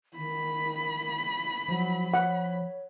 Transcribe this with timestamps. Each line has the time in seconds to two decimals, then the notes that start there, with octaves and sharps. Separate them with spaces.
0.17 D#3 B5
1.68 F3 F#3
2.14 C#5 F#5